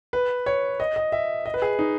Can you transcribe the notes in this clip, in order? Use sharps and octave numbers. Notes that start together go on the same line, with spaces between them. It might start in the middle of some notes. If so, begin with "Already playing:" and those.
B4
C#5
D#5
D#5
E5
D#5
B4
G#4
D#4